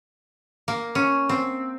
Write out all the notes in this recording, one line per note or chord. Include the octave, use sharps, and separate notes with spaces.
A#3
C#4
C4